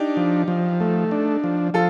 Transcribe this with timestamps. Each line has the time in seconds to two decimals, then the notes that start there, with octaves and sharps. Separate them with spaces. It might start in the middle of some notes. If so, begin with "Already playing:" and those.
Already playing: D4 D#4 G4
0.17 F3
0.48 F3
0.80 A3
1.11 D4
1.44 F3
1.74 F3 F4 A4